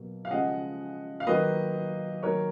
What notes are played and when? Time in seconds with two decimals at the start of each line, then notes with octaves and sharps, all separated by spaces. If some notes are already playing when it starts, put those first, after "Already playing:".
Already playing: B2 F#3 A#3
0.25 F5
0.30 C#3 F3 G#3 D#5 F#5
1.20 F5
1.27 D#3 F#3 A#3 B4 D#5
2.23 D#3 F#3 A#3 A#4 C#5